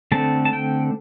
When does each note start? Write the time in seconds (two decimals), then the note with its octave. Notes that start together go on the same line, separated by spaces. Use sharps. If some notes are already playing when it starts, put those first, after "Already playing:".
0.12 D3 A3 C4 A5
0.45 A5
0.53 G5